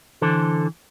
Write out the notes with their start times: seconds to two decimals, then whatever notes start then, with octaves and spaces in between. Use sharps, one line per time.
0.22 D3 E3 A4 C5